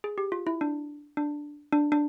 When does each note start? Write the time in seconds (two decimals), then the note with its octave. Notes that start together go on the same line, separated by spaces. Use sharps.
0.04 G#4
0.18 G4
0.32 F4
0.47 E4
0.61 D4
1.17 D4
1.73 D4
1.92 D4